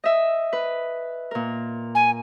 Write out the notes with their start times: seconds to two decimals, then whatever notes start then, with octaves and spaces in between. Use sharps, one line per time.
0.04 D#5 E5
0.53 B4
1.31 A#2 A#4
1.95 G#5